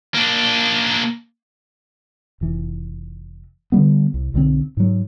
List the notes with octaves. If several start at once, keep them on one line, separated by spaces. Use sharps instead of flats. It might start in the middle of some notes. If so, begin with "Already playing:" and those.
A#3 D4
F1 E3
D3 F3 G3 B3
C2
B1 D3 G3 C4
G#2 F#3